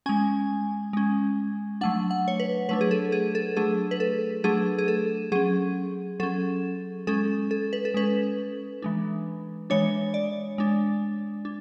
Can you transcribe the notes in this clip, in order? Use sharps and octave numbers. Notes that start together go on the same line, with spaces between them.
G#3 C#4 G#5
G#3 C#4
F#3 A3 D4 F#5
F#5
C#5
B4
F#3 A3 D4 B4
G#4
A4
G#4
A4
F#3 A3 D4 G#4
B4
A4
F#3 A3 D4 G#4
G#4
A4
F#3 C#4 G#4
F#3 C#4 A4
G#3 C#4 A4
A4
B4
A4
G#3 C#4 B4
E3 G#3 D4
E3 G#3 D4 C#5
D5
G#3 D4
D4